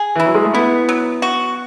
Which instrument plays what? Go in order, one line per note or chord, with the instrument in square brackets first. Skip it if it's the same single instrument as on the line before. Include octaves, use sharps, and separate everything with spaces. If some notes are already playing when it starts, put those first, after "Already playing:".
Already playing: [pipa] G#4
[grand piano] E3 [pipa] E4
[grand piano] F#3
G#3
A3
[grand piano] B3 [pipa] E4
[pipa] F#3
F#4